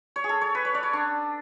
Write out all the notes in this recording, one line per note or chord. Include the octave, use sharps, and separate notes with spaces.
C#5
G#4
A4
C#5
B4
C#5
D5
C#5
D4